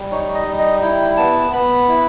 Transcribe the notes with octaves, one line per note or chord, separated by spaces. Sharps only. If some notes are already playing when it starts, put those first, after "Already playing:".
Already playing: G3
D#4 C#5
D#5
G3
D#5
E4 G5
B3 A5
B3 B5
E4